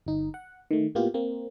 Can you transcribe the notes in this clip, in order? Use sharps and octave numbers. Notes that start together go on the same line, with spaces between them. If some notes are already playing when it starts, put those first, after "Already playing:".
G1 D#4
F#5
D#3 A3
A2 A#3 B3 F4 G4
A#3 C4